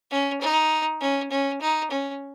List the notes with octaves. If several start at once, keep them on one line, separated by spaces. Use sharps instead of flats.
C#4
D#4
C#4
C#4
D#4
C#4